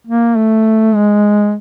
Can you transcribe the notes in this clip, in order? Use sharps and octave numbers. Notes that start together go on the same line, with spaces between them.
A#3
A3
G#3